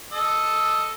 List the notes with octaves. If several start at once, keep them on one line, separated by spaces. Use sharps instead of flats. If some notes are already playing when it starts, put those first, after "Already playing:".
A4 D#5 E6